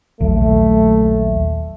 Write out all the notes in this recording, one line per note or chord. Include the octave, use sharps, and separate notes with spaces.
A#1 D#2 F#3 A3